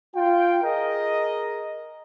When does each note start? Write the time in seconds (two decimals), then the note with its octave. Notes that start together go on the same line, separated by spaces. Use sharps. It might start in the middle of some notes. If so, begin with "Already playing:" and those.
0.15 F4 G5
0.63 G#4 A#4 D#5